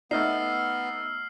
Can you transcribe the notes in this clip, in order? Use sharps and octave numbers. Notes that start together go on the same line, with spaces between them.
A3 B3 D#4 E6 F6 C7